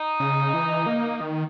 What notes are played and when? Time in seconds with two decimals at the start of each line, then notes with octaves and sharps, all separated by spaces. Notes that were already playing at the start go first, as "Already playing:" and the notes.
Already playing: D#4
0.20 C#3
0.54 E3
0.86 A#3
1.20 D#3